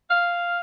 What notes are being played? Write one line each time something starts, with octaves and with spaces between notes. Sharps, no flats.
F5